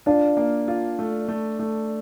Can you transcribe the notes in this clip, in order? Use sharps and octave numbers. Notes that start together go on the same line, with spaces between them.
D4 F4
A#3
F4
A3
A3
A3